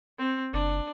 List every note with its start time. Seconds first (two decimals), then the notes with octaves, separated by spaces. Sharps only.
0.19 C4
0.53 F#1 D4